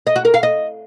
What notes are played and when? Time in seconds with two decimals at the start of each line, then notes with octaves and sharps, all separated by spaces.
0.07 D#5
0.16 F#4
0.25 A#4
0.34 F5
0.43 D#5